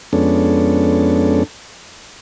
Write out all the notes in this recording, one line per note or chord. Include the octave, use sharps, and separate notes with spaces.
F2 G#3 B3 C#4 D4 A4